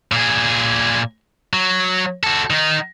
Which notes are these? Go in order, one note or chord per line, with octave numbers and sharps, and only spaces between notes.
A#2 G#4
F#3
F#4 A4
D#3 D#4